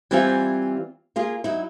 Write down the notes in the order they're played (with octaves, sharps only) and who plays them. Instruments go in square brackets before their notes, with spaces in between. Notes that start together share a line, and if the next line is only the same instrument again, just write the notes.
[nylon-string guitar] E3 G3 C4 E4 F4 G#5
A#3 F4 G#4
F#3 D#4 E4